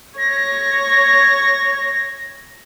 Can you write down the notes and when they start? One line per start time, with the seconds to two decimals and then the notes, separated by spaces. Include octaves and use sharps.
0.18 C#5 A#6